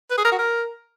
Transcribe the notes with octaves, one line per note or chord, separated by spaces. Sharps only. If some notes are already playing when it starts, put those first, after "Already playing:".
B4
G#4
A#4
F#4
A#4